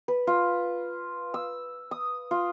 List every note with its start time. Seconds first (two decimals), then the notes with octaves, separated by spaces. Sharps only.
0.08 B4
0.27 F4
1.34 E6
1.91 D#6
2.31 F4